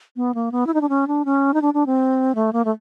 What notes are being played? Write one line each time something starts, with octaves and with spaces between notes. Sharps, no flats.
B3
A#3
B3
E4
D#4
D4
C#4
D4
C#4
D#4
D4
D4
C4
A3
A#3
A3